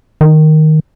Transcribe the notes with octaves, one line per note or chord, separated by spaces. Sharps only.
D#3